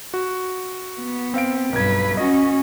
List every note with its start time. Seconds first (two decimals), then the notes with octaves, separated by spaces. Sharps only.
0.14 F#4
0.99 B3
1.34 C4 F5 D7
1.73 B1 G2 B4 G#6
2.17 C#4 F#4 D#5